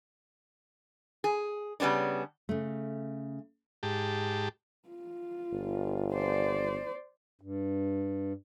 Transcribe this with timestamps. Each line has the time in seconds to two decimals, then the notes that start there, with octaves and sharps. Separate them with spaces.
1.24 G#4
1.80 C#3 G3 B3 C#4 D4
2.49 C#3 A3
3.83 G#2 G4 A5
4.89 F4
5.53 G1
6.14 C5 D5
7.41 G2